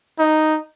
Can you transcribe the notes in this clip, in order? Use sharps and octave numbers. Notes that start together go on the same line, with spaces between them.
D#4